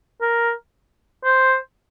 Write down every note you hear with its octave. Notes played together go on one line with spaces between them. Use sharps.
A#4
C5